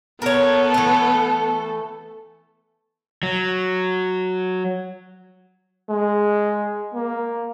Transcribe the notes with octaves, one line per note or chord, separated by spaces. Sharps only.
B3 A4 A#4 C#5
E3 A3
F#3
G#3
A#3